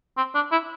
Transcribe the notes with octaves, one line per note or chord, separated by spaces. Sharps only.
C4
D4
E4